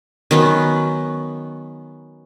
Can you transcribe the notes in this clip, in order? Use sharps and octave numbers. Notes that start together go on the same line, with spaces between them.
D#3 F#3 B3 C#4